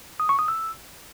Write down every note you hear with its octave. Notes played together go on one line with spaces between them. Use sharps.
D#6
C#6
D#6
E6